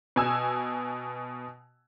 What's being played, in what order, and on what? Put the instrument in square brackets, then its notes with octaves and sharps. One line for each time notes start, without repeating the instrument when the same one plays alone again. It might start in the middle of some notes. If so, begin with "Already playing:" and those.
[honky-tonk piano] B2 G#5 E6